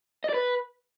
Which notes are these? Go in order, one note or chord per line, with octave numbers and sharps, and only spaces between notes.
D#5
D5
B4